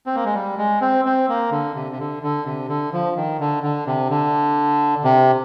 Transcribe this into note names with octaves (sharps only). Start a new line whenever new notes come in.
C4
A#3
G#3
G3
G#3
C4
C4
A#3
D3
C3
C3
D3
D3
C3
D3
F3
D#3
D3
D3
C3
D3
C3